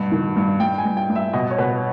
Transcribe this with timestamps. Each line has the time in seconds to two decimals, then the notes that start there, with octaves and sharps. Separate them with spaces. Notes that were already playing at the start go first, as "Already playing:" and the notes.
Already playing: G2 B2
0.12 D#3
0.36 G2
0.60 G2 G5
0.78 G#5
0.85 G2
0.97 G5
1.09 G2
1.15 E5
1.33 B2 D#5
1.51 C#5
1.58 B2 B4